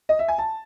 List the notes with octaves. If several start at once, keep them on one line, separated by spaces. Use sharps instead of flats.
D#5
E5
G#5
A5